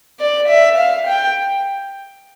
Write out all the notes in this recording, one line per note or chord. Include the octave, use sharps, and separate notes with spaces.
D5
E5
F5
G5